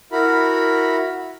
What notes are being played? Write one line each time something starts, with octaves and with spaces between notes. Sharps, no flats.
E4 F#4 A#4 B5